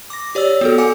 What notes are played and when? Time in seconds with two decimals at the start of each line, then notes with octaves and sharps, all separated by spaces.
0.10 D6 A#6
0.35 G4 C#5 D5 E6
0.61 B3 F#4 A4
0.78 F#5 G#5 D6 C#7